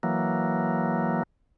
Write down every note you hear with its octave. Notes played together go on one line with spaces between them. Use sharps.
E3 F#3 A#3